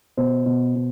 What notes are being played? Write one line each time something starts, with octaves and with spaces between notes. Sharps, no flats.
B2 C5
B2
B2